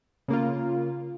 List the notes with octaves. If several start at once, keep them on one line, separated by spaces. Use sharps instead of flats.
C#3 A#3 F4